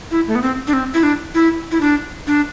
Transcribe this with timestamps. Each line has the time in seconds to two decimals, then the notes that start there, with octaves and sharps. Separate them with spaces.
0.11 E4
0.28 A3
0.35 B3
0.42 C4
0.67 D4
0.73 C4
0.94 E4
1.03 D4
1.35 E4
1.71 E4
1.81 D4
2.27 D4